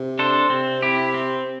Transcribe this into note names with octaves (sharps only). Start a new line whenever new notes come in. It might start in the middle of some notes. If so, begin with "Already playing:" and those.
Already playing: C3
D4 A4 C5
C3 C4
E4 G4
C4